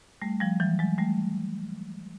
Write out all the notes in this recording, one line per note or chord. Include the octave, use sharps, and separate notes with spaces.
G3 A3
F3 G3
E3 F#3
F#3 G#3
G3 A3